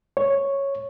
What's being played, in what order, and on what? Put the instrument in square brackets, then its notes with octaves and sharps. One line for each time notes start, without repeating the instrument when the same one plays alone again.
[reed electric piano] C#5